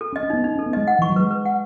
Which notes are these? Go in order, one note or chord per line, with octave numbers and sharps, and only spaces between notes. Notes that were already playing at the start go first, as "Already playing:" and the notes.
A4
C#4
D#5
C#4
B3 D#4
C#4 D#4
C#4
A4
B3
G#3 D#5
F#5
E3
C#6
F#3
G#3 B4
B4
F#5